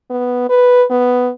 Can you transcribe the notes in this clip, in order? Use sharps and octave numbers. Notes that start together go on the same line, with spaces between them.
B3
B4
B3